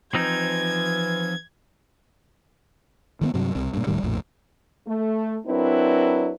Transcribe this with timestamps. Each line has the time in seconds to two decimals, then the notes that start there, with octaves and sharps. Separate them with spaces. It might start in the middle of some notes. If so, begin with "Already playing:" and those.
0.14 E3 F3 C4 D#4 G#6
3.21 D#3 G#3 B3
3.34 G2 C3 F#3
3.55 C2 C3
3.74 G2 A#2
3.87 E1 A2 D#3 G3
4.04 A#1 F2 A2
4.88 A3
5.47 F#3 C4 D4 E4 A#4 B4